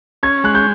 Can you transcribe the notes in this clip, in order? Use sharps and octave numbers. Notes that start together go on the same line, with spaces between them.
C#4 G#6
G#3 F#6
G6